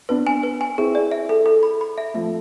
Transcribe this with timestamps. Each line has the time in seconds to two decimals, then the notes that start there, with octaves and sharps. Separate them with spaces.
0.09 B3 D4 B4
0.27 G#5
0.43 B4
0.61 G#5
0.78 C4 E4 G#4
0.95 D5
1.12 E5
1.29 A4
1.46 A4
1.63 B5
1.81 B5
1.98 E5
2.14 F3 A3 E5